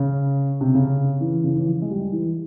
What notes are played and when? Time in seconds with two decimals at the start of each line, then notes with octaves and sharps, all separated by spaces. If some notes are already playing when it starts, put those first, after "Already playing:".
Already playing: C#3
0.61 C3
0.74 C#3
1.21 E3
1.44 C#3
1.55 E3
1.66 F3
1.82 G#3
1.90 G3
2.12 E3